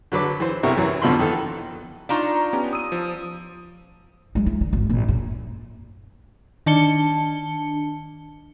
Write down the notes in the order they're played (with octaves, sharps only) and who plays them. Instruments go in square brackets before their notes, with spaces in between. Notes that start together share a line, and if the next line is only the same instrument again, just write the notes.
[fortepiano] D3 F#3 B4 D6
E3 C5
B1 C3 E4 A#4 E5 C#6
F#2 E3 F#3
F2 B2 D3 F3 B5 C6
D#3 E3 A4
[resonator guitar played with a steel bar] D4 D#4 F4 [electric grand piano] F5 A#5 C#6
[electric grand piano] B3 C#4 G4
D#6 E6 D#7
F3
[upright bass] F#3 G#3
E4
D3
G#1 C#3
A#1 C4
F#2
[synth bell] D#3 D4 A5 C#7 G7